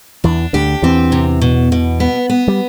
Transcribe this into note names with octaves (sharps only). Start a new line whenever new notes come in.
E2 E3 D4
D2 D3 G4
E2 E3 C4
C3
B2
B2
B3
B3
G3